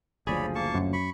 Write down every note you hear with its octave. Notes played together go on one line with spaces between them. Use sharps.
F#1 D2 F3 G#4 C#5 D5 B5
A#3 A5 C#6
F#2
B5 C#6